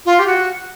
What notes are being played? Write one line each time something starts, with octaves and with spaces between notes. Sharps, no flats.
F4
G4
F#4